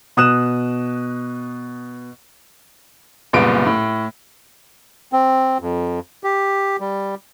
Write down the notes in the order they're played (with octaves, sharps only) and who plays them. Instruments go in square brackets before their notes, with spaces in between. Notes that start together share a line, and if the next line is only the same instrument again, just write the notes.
[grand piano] B2 D#6 F#6 E7
F#1 C2 A#2 B3 D7
A2
[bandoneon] C4
F2
G4
G3